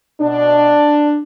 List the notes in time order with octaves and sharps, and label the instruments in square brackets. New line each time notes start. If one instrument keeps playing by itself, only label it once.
[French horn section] B2 D4